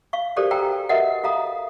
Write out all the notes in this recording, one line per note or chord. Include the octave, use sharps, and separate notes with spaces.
F5 C#6
F#4 G4 A4 A#4 C5 D5
A4 G5 G#5 A#5 E6
F#4 A#4 B4 D#5 E5 F#5
F4 A4 F5 A#5 D#6